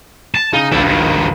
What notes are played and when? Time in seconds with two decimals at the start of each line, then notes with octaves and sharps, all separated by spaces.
0.35 A5
0.53 C#3 D#4
0.71 G#1 C#2 D4 E5
0.84 G2 D#3